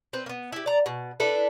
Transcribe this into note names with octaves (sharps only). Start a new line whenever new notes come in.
C4 B4
A#3 B3
E4 G4
D5 A#5
B2
D4 E4 A4 B4